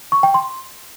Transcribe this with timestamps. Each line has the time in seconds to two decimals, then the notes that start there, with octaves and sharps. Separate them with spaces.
0.12 C#6
0.23 G5
0.34 C6